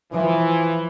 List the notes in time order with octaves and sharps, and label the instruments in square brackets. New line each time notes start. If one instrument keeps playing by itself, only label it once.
[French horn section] E3 [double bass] F3